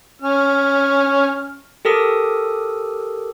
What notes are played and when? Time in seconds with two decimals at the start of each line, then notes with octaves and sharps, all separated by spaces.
0.22 C#4 F6
1.85 G4 A4 A#4 D#6